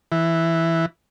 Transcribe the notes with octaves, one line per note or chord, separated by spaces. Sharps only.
E3